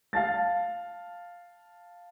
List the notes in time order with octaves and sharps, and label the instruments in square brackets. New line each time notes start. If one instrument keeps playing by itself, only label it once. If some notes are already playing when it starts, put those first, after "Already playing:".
[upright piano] F5 A5 A6